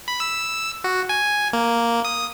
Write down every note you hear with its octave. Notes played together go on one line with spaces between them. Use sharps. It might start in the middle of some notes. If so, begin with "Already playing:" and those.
B5
E6
F#4
G#5
A#3
D#6